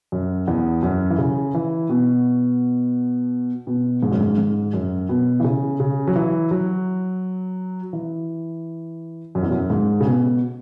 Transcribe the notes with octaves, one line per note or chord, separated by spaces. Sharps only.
F#2
E2
F#2
E3
C#3
E3
B2
B2
G#2
F#2
G#2
G#2
F#2
B2
E3
C#3
C#3
F#3
E3
F#3
E3
F#2
E2
F#2
G#2
C#3
B2